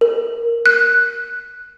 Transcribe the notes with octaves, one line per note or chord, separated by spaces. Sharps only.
A#4
F#6